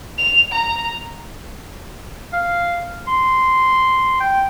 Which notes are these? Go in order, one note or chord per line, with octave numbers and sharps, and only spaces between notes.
F7
A#5
F5
C6
G5